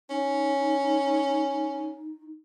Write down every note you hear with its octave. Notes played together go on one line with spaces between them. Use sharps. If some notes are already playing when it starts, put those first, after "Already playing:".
C#4 D#4